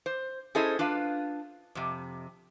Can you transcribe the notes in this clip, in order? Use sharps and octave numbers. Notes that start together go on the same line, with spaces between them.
C5
C#4 E4 G#4 A4 C5 D#5
D4 F4 B4 F5
F2 C3